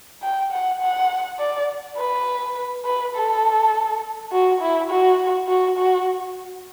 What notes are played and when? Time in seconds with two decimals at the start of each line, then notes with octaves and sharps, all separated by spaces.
0.23 G5
0.51 F#5
0.81 F#5
1.39 D5
1.98 B4
2.85 B4
3.15 A4
4.32 F#4
4.61 E4
4.90 F#4
5.48 F#4
5.78 F#4